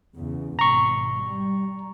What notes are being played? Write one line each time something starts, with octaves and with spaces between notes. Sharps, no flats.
E2 C#3
G#1 B2 A#5 C#6
G3